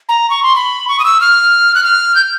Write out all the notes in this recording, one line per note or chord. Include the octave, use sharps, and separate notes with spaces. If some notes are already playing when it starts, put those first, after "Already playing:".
A#5
C#6
C6
B5
C#6
D#6
E6
F6
F#6
F6
G6